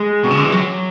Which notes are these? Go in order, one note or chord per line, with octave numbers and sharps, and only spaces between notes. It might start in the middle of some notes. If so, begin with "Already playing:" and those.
Already playing: G#3
B2
C#3
D3
E3
F#3